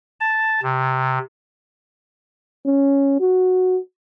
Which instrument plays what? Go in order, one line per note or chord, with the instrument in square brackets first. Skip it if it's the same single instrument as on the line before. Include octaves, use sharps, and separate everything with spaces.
[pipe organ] A5
C3
[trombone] C#4
F#4